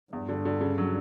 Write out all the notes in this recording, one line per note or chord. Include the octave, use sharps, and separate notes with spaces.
E2 G2
D3
D3
C#3
F#3